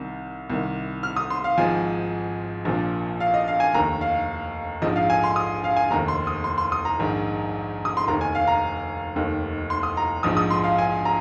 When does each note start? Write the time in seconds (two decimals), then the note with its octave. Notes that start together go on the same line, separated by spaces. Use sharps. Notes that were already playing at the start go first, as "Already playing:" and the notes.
Already playing: C2 C3 D#3
0.50 C2 C3 D#3
1.03 F6
1.16 D#6
1.30 C6
1.44 F5
1.58 G#1 G#2 F3 G#5
2.65 A#1 A#2 F3
3.20 F5
3.34 D#5
3.48 F5
3.60 G#5
3.74 F1 D#2 D#3 A#5
4.01 F5
4.82 A#1 G#2 F3 D#5
4.96 F5
5.10 G#5
5.24 C6
5.36 D#6
5.64 F5
5.77 G#5
5.91 F1 D#2 D#3 A#5
6.08 C6
6.27 D#6
6.44 C6
6.58 C6
6.72 D#6
6.85 A#5
6.99 A#1 G#2 D#3
7.85 D#6
7.97 C6
8.07 F1 D#2 D#3 A#5
8.21 G#5
8.35 F5
8.48 A#5
9.16 F1 D#2 D#3
9.70 C6
9.83 D#6
9.97 A#5
10.23 A#1 G#2 F3 D#6
10.37 D#6
10.51 C6
10.64 F5
10.78 G#5
11.05 A#5